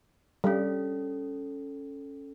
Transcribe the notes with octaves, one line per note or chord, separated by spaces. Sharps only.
G3 C#4 A4